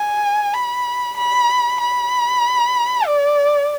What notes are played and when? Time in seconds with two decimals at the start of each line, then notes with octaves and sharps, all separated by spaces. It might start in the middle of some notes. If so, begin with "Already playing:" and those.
Already playing: G#5
0.53 B5
1.17 B5
1.80 B5
3.07 D5